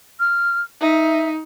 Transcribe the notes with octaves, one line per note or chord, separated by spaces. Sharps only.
F6
D#4 E5